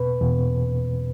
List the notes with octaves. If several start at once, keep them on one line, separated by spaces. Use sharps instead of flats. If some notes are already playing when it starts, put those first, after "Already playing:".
Already playing: E2 B2 B4
E2 B2